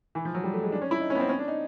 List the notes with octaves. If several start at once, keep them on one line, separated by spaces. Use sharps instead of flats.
E3
F3
F#3
G3
A3
G#3
D4
C#4
E4
D#4
C#4
B3
C4
C#4
D4
D#4